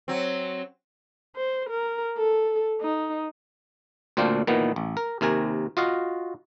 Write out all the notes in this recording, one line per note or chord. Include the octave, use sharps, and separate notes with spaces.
F#3 C4
C5
A#4
A4
D#4
D2 A#2 C4 D4 F5 G5
A#2 D#3 E3 B3
A1
A#4
D#2 C3 A#4 G#5
F4 F#4 D#5 F5